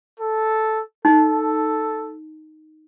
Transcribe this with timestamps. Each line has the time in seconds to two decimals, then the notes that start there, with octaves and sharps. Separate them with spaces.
0.20 A4
1.05 D#4 A4